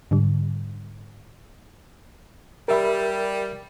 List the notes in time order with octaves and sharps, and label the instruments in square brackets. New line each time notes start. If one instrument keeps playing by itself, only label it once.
[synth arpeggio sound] G#2 D3 G3
[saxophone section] G3 [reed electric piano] A#4 E5 B5